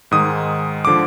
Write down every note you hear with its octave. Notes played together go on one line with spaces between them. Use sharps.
G#2 D#3 G#3 D#6
D3 F3 D6